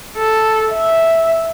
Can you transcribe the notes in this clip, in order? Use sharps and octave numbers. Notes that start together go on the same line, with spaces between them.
A4
E5